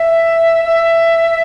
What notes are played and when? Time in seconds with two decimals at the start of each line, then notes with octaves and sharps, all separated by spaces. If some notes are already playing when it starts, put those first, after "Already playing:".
Already playing: E5
0.64 E5